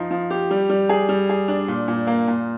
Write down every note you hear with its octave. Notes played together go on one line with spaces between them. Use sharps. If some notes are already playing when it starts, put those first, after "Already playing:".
Already playing: F3 D#4
F3
G4
G3
G3
G#4
G3
G#4
D4
A#2
A#2
A#3
A#2